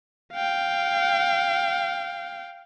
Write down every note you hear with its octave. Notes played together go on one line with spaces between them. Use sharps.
F5 G5